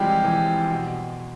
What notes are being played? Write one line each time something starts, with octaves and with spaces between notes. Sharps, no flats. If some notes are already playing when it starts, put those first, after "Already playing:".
Already playing: C3 E3 F3 G3 G#3 G4
E3
B2